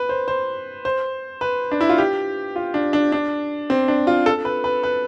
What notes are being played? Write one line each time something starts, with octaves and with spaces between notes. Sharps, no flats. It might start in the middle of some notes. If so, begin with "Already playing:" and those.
Already playing: B4
C5
C5
C5
B4
D4
E4
F4
G4
F4
D4
D4
D4
C4
D4
F4
A4
B4
B4
B4